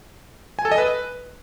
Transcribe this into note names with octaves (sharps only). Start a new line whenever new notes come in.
G#5
A4
D#5
B4